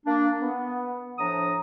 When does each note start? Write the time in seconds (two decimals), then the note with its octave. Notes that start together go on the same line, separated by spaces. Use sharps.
0.06 A#3 D4
0.41 B3
1.18 A2 F3 D4 A#5 D#6